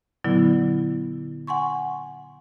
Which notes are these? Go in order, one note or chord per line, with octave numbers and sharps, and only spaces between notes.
A#2 D3 F#3 B3 E4
F#5 G#5 C6 C#6